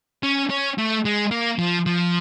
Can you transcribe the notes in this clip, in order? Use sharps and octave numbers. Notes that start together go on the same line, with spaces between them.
C#4
C#4
A3
G#3
A#3
F3
F3